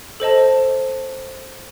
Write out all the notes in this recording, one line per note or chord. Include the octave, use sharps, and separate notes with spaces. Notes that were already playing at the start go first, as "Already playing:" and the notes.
A4 C5 D#5 A5